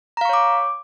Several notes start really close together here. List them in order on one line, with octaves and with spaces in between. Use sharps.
A#5 F5 C#6 C#5 D6